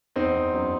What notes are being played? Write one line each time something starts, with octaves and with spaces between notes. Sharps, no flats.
E2 C4 D#4
E2
F#2